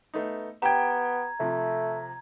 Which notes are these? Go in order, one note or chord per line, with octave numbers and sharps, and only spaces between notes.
A3 B3 D#4
B3 G4 G5 A#5 G#6
C3 F3 A3